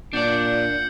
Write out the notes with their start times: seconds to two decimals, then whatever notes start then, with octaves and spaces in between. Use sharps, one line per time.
0.13 A#2 D4 D5 F#5 G6